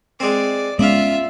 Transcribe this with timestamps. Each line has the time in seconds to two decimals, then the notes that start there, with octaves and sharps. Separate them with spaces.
0.20 G#3 C4 D5
0.79 G#3 B3 C#4 F4 D5 E5 F5